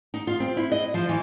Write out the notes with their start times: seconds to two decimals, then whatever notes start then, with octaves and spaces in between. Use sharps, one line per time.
0.14 D#4
0.27 F4
0.40 C4
0.57 E4
0.72 D#5
0.94 F3
1.09 E3